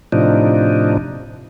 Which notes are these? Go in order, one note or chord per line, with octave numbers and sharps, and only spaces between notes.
A2 C3 F3 D4 D#4